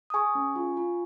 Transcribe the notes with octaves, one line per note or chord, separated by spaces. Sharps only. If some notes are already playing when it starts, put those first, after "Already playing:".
D#6
G#4 G#5 C#6
C#4
F4
F4